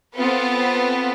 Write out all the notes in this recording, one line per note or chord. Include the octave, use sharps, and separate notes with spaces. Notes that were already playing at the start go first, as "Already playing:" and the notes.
B3 C4 F4 A4 B4